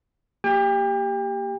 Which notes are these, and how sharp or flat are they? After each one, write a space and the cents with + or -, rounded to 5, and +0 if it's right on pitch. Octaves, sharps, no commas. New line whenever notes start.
A#3 -10 G4 +0 G5 +35